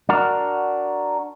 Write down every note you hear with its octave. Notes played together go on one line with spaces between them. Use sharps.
D4 F#4 A#4